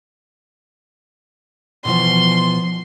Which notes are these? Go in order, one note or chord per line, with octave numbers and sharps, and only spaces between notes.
B2 E3 F3 C6